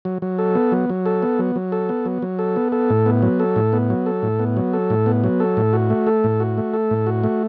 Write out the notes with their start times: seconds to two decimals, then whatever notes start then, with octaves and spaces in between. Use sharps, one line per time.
0.05 F#3
0.22 F#3
0.38 A4
0.55 B3
0.72 F#3
0.90 F#3
1.06 A4
1.23 B3
1.39 F#3
1.56 F#3
1.72 A4
1.89 B3
2.05 F#3
2.22 F#3
2.39 A4
2.56 B3
2.72 A4
2.90 A2
3.06 B3
3.22 F#3
3.40 A4
3.56 A2
3.73 B3
3.90 F#3
4.06 A4
4.22 A2
4.39 B3
4.57 F#3
4.73 A4
4.90 A2
5.06 B3
5.24 F#3
5.40 A4
5.57 A2
5.73 F#4
5.90 A3
6.07 A4
6.24 A2
6.40 F#4
6.58 A3
6.74 A4
6.91 A2
7.07 F#4
7.24 A3